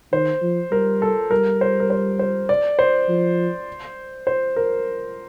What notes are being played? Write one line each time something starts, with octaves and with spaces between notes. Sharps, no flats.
D#3 C5
F3
G3 A#4
A4
G3 A#4
C5
A#4
C5
C5
D5
C5
F3
C5
A#4